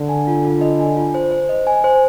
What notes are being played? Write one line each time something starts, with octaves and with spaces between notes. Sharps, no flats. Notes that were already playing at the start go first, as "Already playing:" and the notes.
Already playing: D3
G#5
F4
F4
D#5
G#5
F4
C5
C5
D#5
G#5
C5